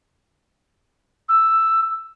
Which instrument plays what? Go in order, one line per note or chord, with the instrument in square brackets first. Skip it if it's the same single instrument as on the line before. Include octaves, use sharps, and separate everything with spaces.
[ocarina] E6